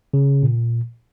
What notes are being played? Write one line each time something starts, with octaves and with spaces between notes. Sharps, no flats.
C#3
A#2